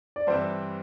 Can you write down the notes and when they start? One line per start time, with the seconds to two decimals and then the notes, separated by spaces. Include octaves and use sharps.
0.16 D5
0.27 G2 E3 G3 C4 E4 C5